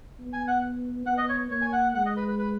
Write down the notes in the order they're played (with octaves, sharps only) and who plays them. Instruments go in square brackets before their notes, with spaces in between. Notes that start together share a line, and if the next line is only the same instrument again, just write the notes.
[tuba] B3
[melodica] G#5
F#5
[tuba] B3 [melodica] F#5
[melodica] D#5
C#5
[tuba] A#3 [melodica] C#5
[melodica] G#5
F#5
[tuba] G#3 [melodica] F#5
[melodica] D#5
B4
B4
B4